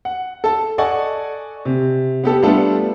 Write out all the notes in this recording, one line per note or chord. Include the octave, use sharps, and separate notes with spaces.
F#5
A4 A5
A4 D5 D#5 F#5 G#5 C#6
C3
B3 G4 A4
G3 A3 B3 D4 F4 A4